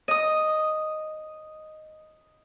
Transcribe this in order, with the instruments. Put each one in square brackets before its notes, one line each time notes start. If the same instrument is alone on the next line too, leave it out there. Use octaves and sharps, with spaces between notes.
[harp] D#5 D#6